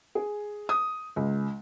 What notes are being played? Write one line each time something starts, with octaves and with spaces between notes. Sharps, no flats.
G#4
D#6
C#2